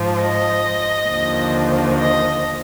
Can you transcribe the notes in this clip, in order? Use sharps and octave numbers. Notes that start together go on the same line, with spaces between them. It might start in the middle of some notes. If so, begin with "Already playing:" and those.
Already playing: G#2 F3
D#5
D#2 D3 F3
D#5